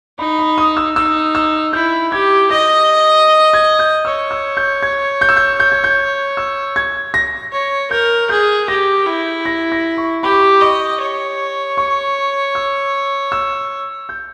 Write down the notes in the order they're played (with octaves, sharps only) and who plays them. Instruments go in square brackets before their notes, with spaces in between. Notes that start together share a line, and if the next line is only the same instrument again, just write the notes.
[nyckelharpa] D#4 [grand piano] B5
[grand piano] B5
D#6
E6
[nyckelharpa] D#4 [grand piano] E6
[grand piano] E6
[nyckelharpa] E4 [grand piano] G6
[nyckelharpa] G4 [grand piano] G#6
[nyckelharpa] D#5 [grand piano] A#6
[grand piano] G#6
G6
[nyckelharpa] C#5 [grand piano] E6
[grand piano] E6
G6
G#6
G6
E6
G6
G6
G#6
G6
E6
G#6
A#6
[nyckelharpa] C#5
[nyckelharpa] A#4 [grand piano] G6
[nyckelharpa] G#4 [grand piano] G6
[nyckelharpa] G4 [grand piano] A#6
[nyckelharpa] E4
[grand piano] A#6
A#6
C#6
[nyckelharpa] G4 [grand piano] B5
[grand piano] C#6
B5
[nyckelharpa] D#5 [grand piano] C#6
[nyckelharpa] C#5
[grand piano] C#6
E6
E6
G6